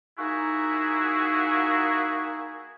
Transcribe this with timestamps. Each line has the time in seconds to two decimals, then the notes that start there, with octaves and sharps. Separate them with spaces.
0.18 A#3 D#4 E4 F#4 G#4